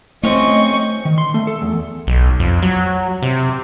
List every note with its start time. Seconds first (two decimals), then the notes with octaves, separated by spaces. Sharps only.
0.23 A3 C4 C#4 D#5 C#6
1.05 D#3
1.18 C6
1.34 A3
1.47 A4
1.62 E2
2.07 B1
2.40 F2
2.62 F#3
3.23 C3